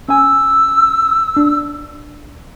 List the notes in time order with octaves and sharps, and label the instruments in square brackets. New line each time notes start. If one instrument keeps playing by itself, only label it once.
[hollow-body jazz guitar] C#4 G#5 [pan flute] E6
[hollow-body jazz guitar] D4